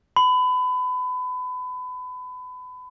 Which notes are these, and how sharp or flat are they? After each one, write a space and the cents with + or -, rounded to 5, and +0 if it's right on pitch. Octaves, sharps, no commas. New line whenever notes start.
B5 +30